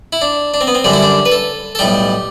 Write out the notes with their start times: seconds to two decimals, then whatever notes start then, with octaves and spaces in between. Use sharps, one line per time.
0.13 E4
0.21 D4
0.54 D4
0.61 C4
0.67 B3
0.75 C4
0.84 F#2 D3 G3 D4
0.93 E4
1.02 D4
1.25 B4
1.32 A4
1.75 A4
1.79 B1 A2 G3 G4